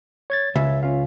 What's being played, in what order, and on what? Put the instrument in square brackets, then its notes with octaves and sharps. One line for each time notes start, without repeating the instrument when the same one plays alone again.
[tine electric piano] C#5 G#6 A6
[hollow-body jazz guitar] C#2 [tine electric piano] E5
[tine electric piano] C#4 F4 F5